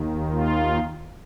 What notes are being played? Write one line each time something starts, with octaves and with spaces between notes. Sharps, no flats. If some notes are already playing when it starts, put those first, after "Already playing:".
Already playing: D#2 D#3
F4